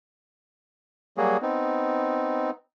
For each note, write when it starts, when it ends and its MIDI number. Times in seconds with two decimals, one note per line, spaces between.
1.17 1.37 54
1.17 1.37 55
1.17 1.37 58
1.17 1.37 66
1.17 1.37 68
1.42 2.50 59
1.42 2.50 60
1.42 2.50 63